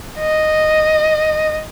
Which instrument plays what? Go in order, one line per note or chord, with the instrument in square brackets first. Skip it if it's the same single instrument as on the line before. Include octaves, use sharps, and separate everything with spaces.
[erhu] D#5